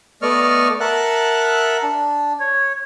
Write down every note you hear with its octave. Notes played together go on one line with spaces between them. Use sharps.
A3 B3 D5 D#5 C#6 F6
A#4 E5 F#5 A5 F#6
D4
C#5